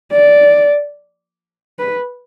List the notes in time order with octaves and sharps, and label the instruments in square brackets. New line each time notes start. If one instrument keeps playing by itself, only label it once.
[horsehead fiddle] D5
B4